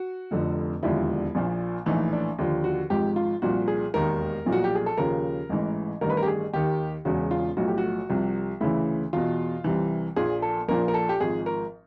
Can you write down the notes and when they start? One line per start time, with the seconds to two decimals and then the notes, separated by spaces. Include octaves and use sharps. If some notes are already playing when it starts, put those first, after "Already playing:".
Already playing: F#4
0.31 F1 F2 D3 F3
0.83 E1 D#2 D3 F3 E4
1.35 A#1 A#2 F3
1.86 A#1 A2 E3 D#4
2.13 D4
2.38 D#2 D3 F3
2.64 F#4
2.90 G#1 G#2 F3 G4
3.16 F4
3.42 C2 A#2 F3 F#4
3.68 G#4
3.94 E1 D#2 D#3 A#4
4.46 B1 A#2 F3
4.52 F#4
4.64 G4
4.75 G#4
4.86 A4
4.98 D#2 C#3 F3 A#4
5.49 A1 G#2 E3
6.01 A1 G2 D#3 A#4
6.10 B4
6.17 A#4
6.23 G4
6.27 G#4
6.53 D#2 D#3 G4
7.05 E1 E2 C#3 F#4
7.31 F4
7.57 B1 A2 F3 F#4
7.68 G4
7.78 F#4
8.09 C2 C3 F3
8.61 D2 C#3 E3 E4
9.13 E2 B2 F4
9.64 C2 C3 E3
10.16 A#1 A#2 F3 G#4
10.42 A4
10.68 A#1 A#2 F3 A#4
10.88 A#4
10.94 A4
11.09 G4
11.20 G#1 G#2 F3 G#4
11.46 A#4